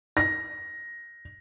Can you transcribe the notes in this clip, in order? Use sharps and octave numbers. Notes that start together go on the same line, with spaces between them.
A#6